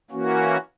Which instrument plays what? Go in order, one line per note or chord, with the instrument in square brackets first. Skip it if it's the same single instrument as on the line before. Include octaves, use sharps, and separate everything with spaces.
[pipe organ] E3 A#3 C#4 F#4